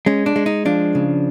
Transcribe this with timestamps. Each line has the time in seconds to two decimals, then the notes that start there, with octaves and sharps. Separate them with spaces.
0.06 G#3 C#4
0.26 D4
0.36 G#3
0.46 D#4
0.65 F3 D4
0.95 C#3